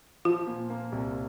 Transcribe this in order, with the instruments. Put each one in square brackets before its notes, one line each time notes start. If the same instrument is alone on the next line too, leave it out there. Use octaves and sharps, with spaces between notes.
[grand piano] F3 [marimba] F4
[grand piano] A#2
A#3
C2